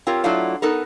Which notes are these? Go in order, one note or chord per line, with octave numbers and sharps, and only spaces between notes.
C4 F4 G4 A#4 C#5
F#3 A3 D4 E4 F4 C#5
B3 D#4 A4 A#4